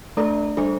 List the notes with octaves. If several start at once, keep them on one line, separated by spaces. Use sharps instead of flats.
A3 D4 A4 D5
G3 D4 A4 C5